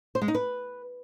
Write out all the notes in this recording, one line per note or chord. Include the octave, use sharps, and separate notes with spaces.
C5
G#3
D#4
B4